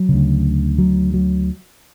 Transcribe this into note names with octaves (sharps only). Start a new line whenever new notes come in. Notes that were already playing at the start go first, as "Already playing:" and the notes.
Already playing: F#3
D2 C#3
F#3
F#3